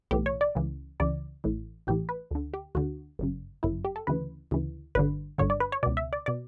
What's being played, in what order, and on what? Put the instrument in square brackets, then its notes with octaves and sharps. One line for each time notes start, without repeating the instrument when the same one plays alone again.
[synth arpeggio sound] B1 A2 E3 G4
C#5
D5
C#2 C#3 E3
C#2 C#3 E3 D5
A1 A2 E3
A1 A2 E3 G4
B4
D2 D3
G4
D2 D3 F#4
G1 F#2 C#3
G1 F#2 C#3 E4
G4
A4
D2 C#3 E3 B4
D2 C#3 E3
G1 G2 D3 B4
G1 G2 D3 C#5
D5
B4
C#5
B2 D5
C#2
E5
D5
B2 D5